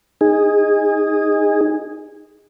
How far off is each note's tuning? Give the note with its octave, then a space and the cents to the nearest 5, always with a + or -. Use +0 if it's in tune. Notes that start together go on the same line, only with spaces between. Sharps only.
D#4 +0 G#4 -20